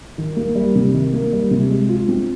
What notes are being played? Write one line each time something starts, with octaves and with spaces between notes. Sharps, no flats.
D#3
A#3
G3
C3
D#3
A#3
G3
C3
G#3
F4
C4